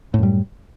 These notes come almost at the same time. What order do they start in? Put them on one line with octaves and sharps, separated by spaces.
A2 F#2 G3